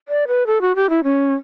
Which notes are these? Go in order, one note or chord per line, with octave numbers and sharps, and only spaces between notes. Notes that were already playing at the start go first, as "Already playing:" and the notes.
D5
B4
A4
F#4
G4
E4
C#4